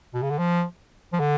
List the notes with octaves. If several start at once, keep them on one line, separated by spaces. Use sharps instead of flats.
B2
C#3
D3
F3
F3
D3